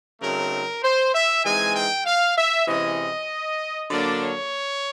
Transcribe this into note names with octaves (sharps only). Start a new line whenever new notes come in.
C#3 F#3 A3 C4 D#4 A#4
C5
E5
E3 G#3 C4 D#4 G#5
G5
F5
E5
C3 E3 G#3 C#4 D#5
D3 F#3 A#3 D4 D5
C#5